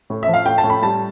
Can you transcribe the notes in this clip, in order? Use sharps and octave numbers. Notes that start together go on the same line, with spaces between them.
A2
E5
F3
F5
A2 G5
A5
A2
B5
G3 A5